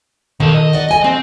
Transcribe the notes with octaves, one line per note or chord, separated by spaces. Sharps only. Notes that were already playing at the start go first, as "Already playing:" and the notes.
B2 D#3 A4
D#5
F#4 D5
A3 G#5
C4 F#4